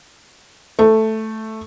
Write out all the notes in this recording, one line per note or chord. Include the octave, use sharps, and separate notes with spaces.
A3